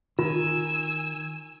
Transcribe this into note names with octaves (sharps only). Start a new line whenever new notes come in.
D#3 F4 G#5 E6